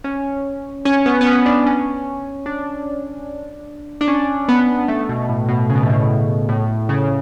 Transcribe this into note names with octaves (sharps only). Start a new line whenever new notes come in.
C#4
C#4
B3
B3
C#4
D4
C#4
D4
D4
C#4
B3
A3
B2
A2
B2
C#3
B2
A2
B2
A2
C#3